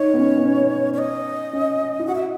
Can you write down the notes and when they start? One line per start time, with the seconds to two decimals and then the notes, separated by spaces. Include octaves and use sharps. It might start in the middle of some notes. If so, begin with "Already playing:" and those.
Already playing: D#4 C#5
0.14 B3
0.18 C#4
0.36 B3
0.44 C#4
0.94 C#5
0.98 D#5
1.53 C#4
1.99 E4
2.07 F#4 F#5
2.15 E5